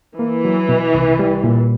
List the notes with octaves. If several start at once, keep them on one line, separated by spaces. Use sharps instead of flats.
E3 A#3
F#3
B2
C2
G3
A#2